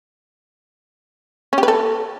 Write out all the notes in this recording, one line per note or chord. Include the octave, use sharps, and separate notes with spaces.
C#4
G4
B4
A4